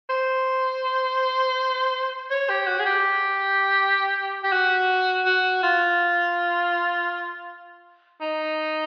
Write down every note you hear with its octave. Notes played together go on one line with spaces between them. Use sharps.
C5
C#5
G4
F#4
G#4
G4
G4
F#4
F#4
F4
D#4